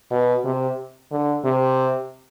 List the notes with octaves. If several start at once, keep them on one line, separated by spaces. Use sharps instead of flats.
B2
C3
D3
C3